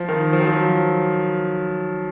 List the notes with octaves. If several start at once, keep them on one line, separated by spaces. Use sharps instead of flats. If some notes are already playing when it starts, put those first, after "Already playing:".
Already playing: F3
D#3
F3
F#3
F3